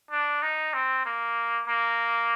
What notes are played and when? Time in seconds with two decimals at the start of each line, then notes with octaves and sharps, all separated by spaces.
0.11 D4
0.43 D#4
0.74 C4
1.06 A#3
1.68 A#3